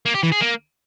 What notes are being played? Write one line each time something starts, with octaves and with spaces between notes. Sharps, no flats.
A#3
G4
E3
G#4
A#3